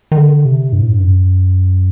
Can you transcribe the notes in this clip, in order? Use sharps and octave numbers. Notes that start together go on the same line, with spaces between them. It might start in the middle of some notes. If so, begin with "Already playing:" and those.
D#3
D3
C3
G2
A2
G2
F#2